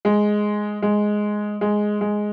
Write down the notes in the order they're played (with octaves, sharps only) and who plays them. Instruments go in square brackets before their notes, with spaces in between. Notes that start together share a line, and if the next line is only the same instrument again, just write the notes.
[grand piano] G#3
G#3
G#3
G#3